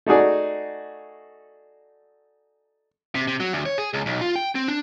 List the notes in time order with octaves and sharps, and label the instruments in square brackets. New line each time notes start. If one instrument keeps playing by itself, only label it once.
[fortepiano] A3 D#4 F#4 G#4 D5
[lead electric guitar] C3
C3
F#3
D2
C#5
G#4
C#2
B1
F4
G5
C4
D4